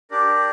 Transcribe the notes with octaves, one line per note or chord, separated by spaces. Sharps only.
D4 G4 A#4 D5